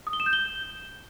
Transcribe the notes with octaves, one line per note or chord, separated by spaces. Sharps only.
D#6
G7
E7
G6
G7